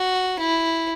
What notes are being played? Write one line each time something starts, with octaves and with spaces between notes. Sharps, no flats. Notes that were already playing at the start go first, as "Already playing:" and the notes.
Already playing: F#4
E4